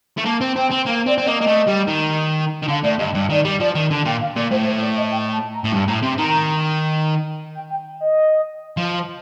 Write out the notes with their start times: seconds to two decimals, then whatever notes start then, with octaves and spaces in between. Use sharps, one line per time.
0.17 A3
0.25 A#3 A5
0.41 C4
0.56 C4 G5
0.71 C4
0.86 A#3 F5
1.06 C4 D5
1.18 C4 D5
1.27 A#3 D#5
1.41 A#3
1.47 A3
1.67 G3
1.88 D#3
2.63 D#3
2.68 D3 F5
2.83 A2 D5
2.99 G2 D#5
3.14 G2 D5
3.30 D#3 D5
3.45 G3
3.60 F3 D5
3.75 D#3
3.90 D3 A5
4.05 A#2 G5
4.21 F5
4.36 A#2 D5
4.51 A2 C5
4.66 C5
4.81 D5
4.97 D#5
5.11 G5
5.32 A5
5.53 A#5
5.64 A2
5.72 G2 A5
5.88 A2 A#5
6.03 C3 C6
6.18 D#3 A#5
7.55 G5
7.70 G5
8.00 D#5
8.77 F3